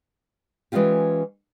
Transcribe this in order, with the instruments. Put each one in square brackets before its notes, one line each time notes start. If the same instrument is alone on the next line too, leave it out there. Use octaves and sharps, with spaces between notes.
[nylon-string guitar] E3 G#3 A#3 C#4 F4 G4